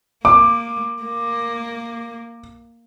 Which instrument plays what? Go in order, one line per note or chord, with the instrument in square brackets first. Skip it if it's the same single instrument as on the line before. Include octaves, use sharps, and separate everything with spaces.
[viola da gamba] A#3 [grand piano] D6
[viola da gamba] A#3